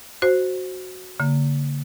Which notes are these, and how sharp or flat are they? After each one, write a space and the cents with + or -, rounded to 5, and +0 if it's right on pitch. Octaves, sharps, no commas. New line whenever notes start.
F#4 +0 C5 +0
D3 -45 A#3 -15